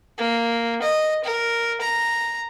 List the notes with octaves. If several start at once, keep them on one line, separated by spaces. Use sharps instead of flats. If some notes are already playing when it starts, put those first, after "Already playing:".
A#3
D#5
A#4
A#5